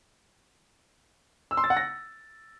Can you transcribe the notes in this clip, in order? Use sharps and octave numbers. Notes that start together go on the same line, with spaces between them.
E6
C6
A6
F#5
A#6